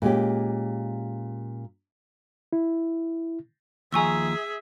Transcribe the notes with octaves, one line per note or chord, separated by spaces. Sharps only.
A#2 G#3 C#4 G4
E4
D#2 F3 G#4 E5 G#5 A#5 C#6 E6